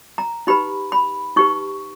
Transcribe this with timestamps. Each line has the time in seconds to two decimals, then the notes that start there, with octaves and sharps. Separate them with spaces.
0.18 A#5
0.47 D#4 G4 B4 B5
0.92 B5
1.36 D#4 G4 B4 C#6